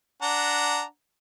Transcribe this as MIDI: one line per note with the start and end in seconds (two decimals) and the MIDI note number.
0.22 0.83 62
0.22 0.83 78
0.22 0.83 82